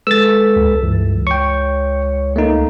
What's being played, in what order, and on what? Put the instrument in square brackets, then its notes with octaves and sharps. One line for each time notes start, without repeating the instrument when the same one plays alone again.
[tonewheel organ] G#3 A4 B4 [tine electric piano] E6 A6
[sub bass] C#2
[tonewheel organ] G2 E3
[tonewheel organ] C#5 [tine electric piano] G5 C#6
[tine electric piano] A3 A#3 D#4